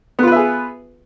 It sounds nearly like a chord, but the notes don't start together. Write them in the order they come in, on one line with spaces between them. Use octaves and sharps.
B3 F4 B4 E5 G#4